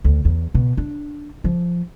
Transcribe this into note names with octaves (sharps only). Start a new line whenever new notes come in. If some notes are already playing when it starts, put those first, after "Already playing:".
D2
E2
B2
D4
F3